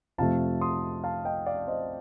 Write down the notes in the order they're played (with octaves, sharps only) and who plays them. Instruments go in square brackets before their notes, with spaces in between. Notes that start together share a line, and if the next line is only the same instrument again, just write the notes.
[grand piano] F2 C3 F3 A3 F5 A5
C6 D#6
F5 A5
D#5 G5
D5 F5
C5 D#5